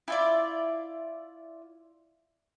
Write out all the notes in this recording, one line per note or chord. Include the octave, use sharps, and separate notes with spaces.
E4 F4 D5